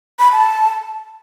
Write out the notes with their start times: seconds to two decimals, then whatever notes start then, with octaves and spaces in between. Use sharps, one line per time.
0.19 B5
0.32 A5